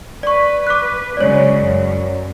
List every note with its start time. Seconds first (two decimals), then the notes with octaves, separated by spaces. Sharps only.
0.23 B4 D5 C#6
0.67 D6 F#6
1.17 C#3 F#3 G#3 C#5 D5
1.60 F#2